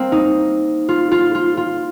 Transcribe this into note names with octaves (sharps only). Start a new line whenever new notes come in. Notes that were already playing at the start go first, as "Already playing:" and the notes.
Already playing: A#3 C4
D#4
F4
F4
F4
F4